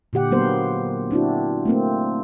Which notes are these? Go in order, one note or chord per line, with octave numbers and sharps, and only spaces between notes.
A#2 D3 G4 F#5
F#3 A#3 B3 A#4 C5
C4 D4 E4 F#4
A3 A#3 C4